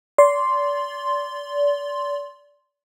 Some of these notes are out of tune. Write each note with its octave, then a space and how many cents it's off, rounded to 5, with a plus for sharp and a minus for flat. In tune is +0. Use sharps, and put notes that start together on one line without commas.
D5 -30 C6 +0